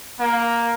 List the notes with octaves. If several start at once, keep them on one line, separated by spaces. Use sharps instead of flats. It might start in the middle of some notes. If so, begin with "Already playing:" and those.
A#3